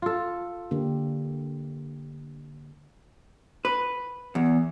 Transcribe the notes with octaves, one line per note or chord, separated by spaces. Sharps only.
F4 A4
D3 A#3 G4
B4
E2